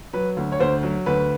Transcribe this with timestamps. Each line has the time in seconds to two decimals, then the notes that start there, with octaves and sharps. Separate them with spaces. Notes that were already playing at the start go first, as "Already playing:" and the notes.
0.13 F#3 B4
0.37 D2
0.52 C#5
0.60 D2 C5
0.83 F#3
1.06 D2 B4